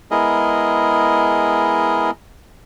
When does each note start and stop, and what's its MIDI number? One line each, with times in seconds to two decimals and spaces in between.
0.11 2.10 56
0.11 2.10 59
0.11 2.10 64
0.11 2.10 68
0.11 2.10 70
0.11 2.10 75